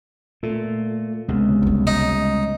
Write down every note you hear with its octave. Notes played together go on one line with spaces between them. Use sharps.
A#2 A3 F4 A4
C#2 C3 G#3 B3
G3 A3
D#4